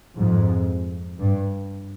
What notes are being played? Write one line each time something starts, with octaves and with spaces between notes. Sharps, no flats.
F2 G#2
G2